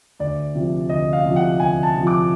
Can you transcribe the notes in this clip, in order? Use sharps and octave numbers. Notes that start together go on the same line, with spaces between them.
D2 D5
C3 F3
D2 D#5
F5
C3 F3
F#5
D2 G#5
A5
C3 F3
D6